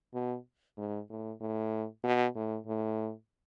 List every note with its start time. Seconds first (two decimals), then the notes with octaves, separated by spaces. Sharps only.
0.14 B2
0.77 G#2
1.10 A2
1.41 A2
2.04 B2
2.35 A2
2.67 A2